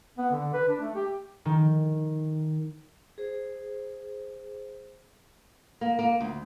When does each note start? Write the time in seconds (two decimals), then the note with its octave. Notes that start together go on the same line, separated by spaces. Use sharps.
0.18 B3
0.31 D3
0.53 B4
0.68 D4
0.81 A3
0.95 G4
1.45 D#3
3.18 G#4 C5
5.81 A#3
5.99 A#3
6.20 D2